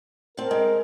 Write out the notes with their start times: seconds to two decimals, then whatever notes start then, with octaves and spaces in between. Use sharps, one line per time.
0.37 C4 A#4 A5
0.51 G#3